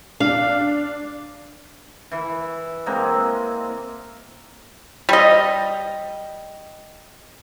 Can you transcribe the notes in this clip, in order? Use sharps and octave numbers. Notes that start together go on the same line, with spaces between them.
D4 F5
E3
G#3 A#3 C4 A#5
G3 D#5